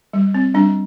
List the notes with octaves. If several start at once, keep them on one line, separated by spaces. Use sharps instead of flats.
G3
C4
G3 D4